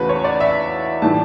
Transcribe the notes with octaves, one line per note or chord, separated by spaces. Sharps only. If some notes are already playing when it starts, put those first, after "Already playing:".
Already playing: E2 C#3 E3 A3 F#4 B4
C#5
D5
E5
A2 E3 G3 A5